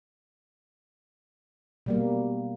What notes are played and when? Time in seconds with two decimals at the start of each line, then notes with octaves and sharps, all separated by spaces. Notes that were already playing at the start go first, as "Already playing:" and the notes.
1.86 B2 G3 A#3